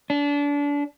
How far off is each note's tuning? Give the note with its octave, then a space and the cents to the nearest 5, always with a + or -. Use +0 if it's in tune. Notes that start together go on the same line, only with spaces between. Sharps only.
D4 -30